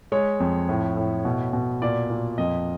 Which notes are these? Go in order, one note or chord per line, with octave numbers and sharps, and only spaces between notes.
G#3 C#5
F2
A2
A2
B2
B2
A#2 D5
A#2
F2 D#5